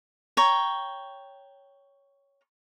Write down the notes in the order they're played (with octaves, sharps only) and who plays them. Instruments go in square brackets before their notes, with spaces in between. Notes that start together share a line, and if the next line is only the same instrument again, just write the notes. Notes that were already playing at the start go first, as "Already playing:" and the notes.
[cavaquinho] C#5 G5 A#5